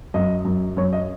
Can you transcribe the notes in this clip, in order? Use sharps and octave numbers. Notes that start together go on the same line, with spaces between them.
F#2 D#5
F#2
F#2 C#5
D#5